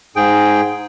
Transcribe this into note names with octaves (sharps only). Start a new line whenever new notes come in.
G#2 G#4 G5